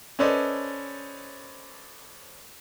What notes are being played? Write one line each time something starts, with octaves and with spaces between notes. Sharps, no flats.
C#4 A4 B4 C5 D5 D#5